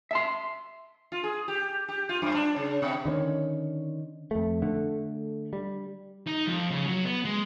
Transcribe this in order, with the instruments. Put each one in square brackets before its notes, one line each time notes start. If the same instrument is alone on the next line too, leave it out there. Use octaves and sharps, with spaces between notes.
[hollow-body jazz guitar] E5 A5 C6
[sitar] F4
G#4
G4
G4
F4
F#2
D4
C#3
B2
[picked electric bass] D3 D#3 B3 C#4
F2 A3
D3 A3
G3
[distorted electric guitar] D#4
F2
C#3
F#3
B3
G#3